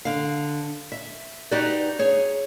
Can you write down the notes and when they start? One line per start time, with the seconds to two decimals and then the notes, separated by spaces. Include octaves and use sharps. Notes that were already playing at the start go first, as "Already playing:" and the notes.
0.05 D3 F5
0.92 E5
1.51 D#4 F#4 G4 B4 D5
1.99 G#4 C#5